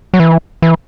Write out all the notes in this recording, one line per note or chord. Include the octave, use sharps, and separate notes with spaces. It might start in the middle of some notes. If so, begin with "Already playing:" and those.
F#3
E3
E3